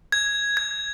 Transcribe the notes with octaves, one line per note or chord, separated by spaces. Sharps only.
G#6
G#6